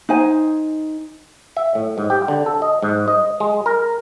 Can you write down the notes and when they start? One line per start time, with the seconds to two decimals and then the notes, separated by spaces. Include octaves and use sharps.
0.09 D#4 C5 G#5
1.57 E5
1.75 A2
1.98 G#2
2.10 G4
2.28 D3
2.46 A4
2.62 D#5
2.83 G#2
3.08 D#5
3.40 G#3
3.66 A#4